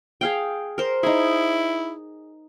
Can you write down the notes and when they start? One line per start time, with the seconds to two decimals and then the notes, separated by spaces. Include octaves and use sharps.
0.21 G#4 F5 G5
0.78 A#4 C5
1.03 D#4 E4 G#4